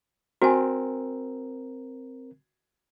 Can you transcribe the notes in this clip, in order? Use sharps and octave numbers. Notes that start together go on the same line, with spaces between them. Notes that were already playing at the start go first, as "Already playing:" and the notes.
C4 F#4 A#4 G#5